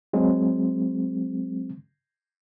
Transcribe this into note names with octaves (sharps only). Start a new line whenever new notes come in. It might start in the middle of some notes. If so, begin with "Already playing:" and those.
F#3 G#3 C4